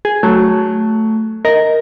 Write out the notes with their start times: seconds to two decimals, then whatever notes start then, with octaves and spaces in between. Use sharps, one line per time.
0.05 G#4
0.23 F#3 A3
1.45 A#4 D#5